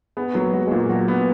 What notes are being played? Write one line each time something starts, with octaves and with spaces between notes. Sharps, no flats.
B3 G#4
F#3 A#3
G#3 F#4
G#3
A#2 A#3
F#3 F#4
B3